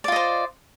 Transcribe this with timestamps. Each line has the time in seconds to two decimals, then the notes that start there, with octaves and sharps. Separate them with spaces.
0.04 D5
0.08 F4
0.12 D#5
0.16 C5